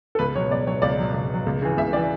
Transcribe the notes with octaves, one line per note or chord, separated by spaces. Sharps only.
A4
C#2 B4
B2 F#3 C#5
C#2 D5
B2 F#3 C#5
C#2 D5
B2 F#3
C#2
B2 F#3
C#2
C#3 E3
C#2 E5
C#3 E3 D5